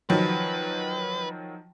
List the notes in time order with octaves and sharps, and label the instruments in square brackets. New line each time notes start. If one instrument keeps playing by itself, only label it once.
[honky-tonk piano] D#3 F3 F#3 [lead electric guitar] B4